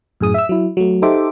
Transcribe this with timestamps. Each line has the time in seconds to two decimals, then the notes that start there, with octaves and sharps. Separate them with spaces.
0.20 F#2 A2 G#4 D#6
0.34 E5 E6
0.49 F#3 E4
0.77 F#3 A3
1.02 D#4 G4 A4 C5 E5 D6